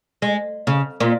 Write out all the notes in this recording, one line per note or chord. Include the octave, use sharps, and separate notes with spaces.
G#3
C#3
A#2